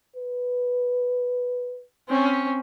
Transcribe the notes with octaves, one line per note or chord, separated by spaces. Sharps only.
B4
C4 C#4